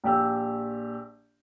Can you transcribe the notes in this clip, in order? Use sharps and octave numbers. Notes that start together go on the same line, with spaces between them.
A#1 G4 E6